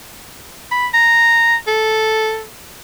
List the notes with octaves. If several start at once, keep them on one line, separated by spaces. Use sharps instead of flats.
B5
A#5
A4